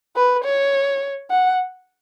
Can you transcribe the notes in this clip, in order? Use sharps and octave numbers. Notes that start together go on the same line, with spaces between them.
B4
C#5
F#5